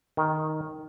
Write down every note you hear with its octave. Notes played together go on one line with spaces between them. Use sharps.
D#3